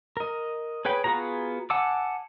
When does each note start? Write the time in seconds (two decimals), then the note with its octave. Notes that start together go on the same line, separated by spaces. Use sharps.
0.17 A#4 D#5
0.85 G#4 B4 C#5 G5 B5
1.04 B3 F4 F#4 G#4 A#5
1.70 F#5 G#5 A5 D6 E6